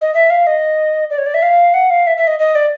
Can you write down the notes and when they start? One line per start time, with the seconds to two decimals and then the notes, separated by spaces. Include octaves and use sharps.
0.01 D#5
0.14 E5
0.30 F5
0.47 D#5
1.10 D5
1.18 C#5
1.26 D5
1.34 E5
1.42 F5
1.74 F#5
1.90 F5
2.07 E5
2.17 E5
2.27 D#5
2.39 D#5
2.55 D5